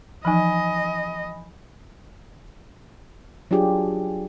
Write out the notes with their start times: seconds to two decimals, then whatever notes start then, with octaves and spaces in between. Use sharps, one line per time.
0.25 E3 F3 D#4 D#5 G#5 B5
3.51 F#3 D4 F4 G4 G#4